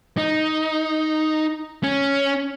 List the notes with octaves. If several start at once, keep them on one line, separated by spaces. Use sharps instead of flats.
D#4
C#4